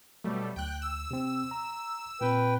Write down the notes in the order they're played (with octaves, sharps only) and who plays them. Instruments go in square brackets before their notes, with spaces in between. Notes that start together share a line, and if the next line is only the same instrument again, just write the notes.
[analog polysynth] B2 G3 A3 [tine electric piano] F#3
[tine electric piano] D2 [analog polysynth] G5 F#6
[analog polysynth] E6
[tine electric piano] C3 C4
A#5
[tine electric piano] A#2 C4 [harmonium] B4 G5